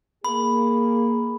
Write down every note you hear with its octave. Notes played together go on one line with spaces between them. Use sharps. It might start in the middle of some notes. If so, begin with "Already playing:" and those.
A#3 G#4 B5